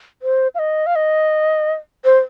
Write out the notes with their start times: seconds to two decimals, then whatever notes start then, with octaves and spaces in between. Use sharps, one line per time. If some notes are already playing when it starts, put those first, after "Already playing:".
0.22 C5
0.55 F5
0.59 D#5
0.87 F5
0.96 D#5
2.05 C5